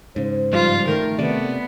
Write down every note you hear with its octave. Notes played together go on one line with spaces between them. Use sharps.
G#2 C#3 C5
G2 F3 G3 F4
D#3 A3 A#4
C3 B3 D5